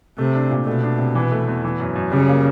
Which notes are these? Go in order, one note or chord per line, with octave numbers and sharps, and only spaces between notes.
C3 A3
D4
A#2
B2 A3
D4
C3
E3
A3
E2
E3
F#2
F#2
C#3 G3
A#3